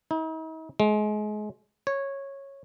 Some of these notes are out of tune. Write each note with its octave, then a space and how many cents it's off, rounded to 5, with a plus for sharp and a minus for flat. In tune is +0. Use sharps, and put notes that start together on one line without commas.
D#4 +45
G#3 +30
C#5 -10